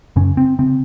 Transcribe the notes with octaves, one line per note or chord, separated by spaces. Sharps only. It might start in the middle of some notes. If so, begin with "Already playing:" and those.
F#2 C#3 C#4
C4
C#3 C4